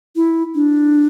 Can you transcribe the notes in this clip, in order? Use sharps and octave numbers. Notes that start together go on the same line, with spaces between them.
E4
D4